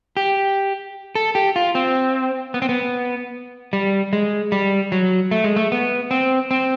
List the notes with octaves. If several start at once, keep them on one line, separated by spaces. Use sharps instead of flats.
G4
A4
G4
F4
C4
B3
C4
B3
G3
G#3
G3
F#3
A3
G#3
A3
B3
C4
C4